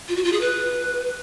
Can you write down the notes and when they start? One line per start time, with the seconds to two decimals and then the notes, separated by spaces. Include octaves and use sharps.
0.08 F4
0.16 F#4
0.24 F4
0.32 G#4
0.41 B4